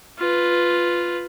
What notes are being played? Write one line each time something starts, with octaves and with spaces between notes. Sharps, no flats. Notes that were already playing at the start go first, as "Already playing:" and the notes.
F4 B4